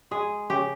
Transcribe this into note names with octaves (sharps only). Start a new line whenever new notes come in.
G#3 G#4
C#3 G4